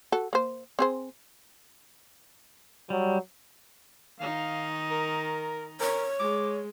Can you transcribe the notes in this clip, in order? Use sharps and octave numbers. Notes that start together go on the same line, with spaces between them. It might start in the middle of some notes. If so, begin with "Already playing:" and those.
F#4 A4
A#3 C5
C4 G#4 C5
F#3 G3
D#3 D#4 F5
A#4
A#4 C#5
G#3 D6